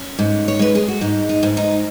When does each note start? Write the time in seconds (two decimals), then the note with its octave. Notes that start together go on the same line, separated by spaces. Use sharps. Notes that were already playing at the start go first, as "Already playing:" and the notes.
Already playing: C#4
0.19 G#2
0.48 C#5
0.59 G#3 B4
0.75 G#4
0.88 F#4
1.01 G#2 D#4
1.29 D#4
1.43 G#2
1.57 D#4